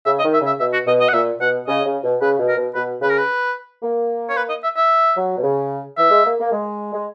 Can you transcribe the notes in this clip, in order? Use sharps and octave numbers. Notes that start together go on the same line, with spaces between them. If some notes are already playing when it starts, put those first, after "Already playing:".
C#3 E5
D#5
D#3
E5
C#3
E5
B2 E5
F#4
B2 D#5
D#5
F#5
A#2 E5
B2 F#5
C#3 D#5
C#3
B2
C#3 B4
B2
A#4
B2
B2 B4
C#3 B4
A#4
B4
A#3
C#5
B4
D#5
E5
E5
F#3
B2
C#3
E3 E5
G#3
A#3
A#3
G#3
G#3